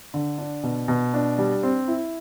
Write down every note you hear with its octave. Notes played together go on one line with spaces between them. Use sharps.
D3
D4
B2
B2
D4
G3
C4
E4